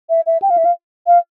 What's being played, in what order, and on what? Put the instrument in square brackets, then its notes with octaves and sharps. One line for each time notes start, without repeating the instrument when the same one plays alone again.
[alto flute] E5
E5
G5
F5
E5
F5
F5